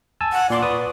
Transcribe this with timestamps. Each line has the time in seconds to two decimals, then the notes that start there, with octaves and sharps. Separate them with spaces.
0.21 G#5 A5 E6
0.33 F#5
0.50 A#2 D5 C6 D6
0.62 B4 C#6 D#6